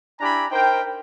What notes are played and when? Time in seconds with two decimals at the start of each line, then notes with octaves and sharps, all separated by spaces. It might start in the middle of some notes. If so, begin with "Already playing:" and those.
0.20 D4 E4 G4 G#5 A#5 B5
0.51 D#4 A#4 C5 G5